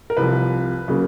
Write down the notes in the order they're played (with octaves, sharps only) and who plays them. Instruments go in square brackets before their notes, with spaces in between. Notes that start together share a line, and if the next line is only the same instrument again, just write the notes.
[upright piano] A#4
C2 C3 F3 B4
C#3 F#3 A#3